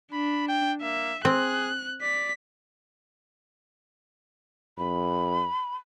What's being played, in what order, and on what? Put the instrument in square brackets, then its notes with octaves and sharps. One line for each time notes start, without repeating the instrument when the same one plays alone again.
[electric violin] D4 [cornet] B5
[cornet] G5
[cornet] A#3 [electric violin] E5
[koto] C4 [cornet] G#4 [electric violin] F#6
[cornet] D5 [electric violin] B6
[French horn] F2 [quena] B5